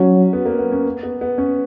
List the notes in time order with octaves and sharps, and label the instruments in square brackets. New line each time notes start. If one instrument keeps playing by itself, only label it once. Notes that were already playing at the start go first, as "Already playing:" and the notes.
Already playing: [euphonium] F#3 [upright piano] C#4
[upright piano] B3
A#3
B3
C#4
B3
B3
C#4